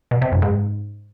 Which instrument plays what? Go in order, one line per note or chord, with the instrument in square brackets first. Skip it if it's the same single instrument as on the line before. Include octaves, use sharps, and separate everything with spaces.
[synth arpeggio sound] B2
C3
F#2
G#2